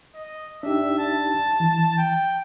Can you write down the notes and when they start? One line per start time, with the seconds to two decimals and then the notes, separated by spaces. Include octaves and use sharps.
0.15 D#5
0.63 D4 D#4 G4 E5
0.99 A5
1.60 E3
1.98 G5